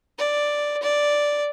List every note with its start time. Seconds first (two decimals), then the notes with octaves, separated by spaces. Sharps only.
0.18 D5
0.83 D5